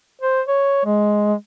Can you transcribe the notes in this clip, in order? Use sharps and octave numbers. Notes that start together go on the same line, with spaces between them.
C5
C#5
G#3